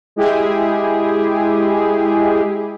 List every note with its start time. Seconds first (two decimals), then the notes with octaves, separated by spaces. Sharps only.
0.16 G#3 E4 G4 G#4